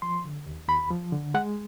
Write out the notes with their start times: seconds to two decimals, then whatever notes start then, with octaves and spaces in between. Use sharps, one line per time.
0.02 F3 C6
0.24 D3
0.46 D#2
0.68 D#2 B5
0.91 F3
1.12 D3
1.34 G#3 F#5